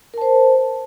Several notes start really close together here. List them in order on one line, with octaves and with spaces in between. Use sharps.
A#4 A5 C5